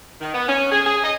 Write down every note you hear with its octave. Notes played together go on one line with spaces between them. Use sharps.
D#3
B3
C#4
G#4
G#4
D#5